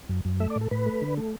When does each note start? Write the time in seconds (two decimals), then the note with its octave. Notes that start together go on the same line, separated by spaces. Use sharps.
0.09 F#2
0.25 F#2
0.40 A3 E5
0.50 D5
0.56 A2
0.61 A4
0.71 A2 B4
0.86 A3
1.02 D3
1.17 A3